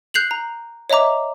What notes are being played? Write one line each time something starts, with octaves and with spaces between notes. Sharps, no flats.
F#6 G6 C7 F7 F#7
A#5
C#5 D#5 E5 A#5 D6